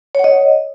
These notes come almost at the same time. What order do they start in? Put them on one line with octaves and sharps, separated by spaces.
C#5 F#5 D#5